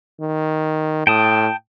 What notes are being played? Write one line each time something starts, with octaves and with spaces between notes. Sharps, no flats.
D#3
A2 G5 A5 D#6